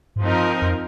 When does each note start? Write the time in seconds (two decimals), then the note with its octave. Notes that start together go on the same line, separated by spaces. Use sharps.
0.16 G#2
0.21 G2 F3 C4 D#4 A#4
0.62 F2